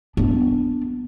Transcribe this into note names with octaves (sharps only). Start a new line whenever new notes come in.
B3 D4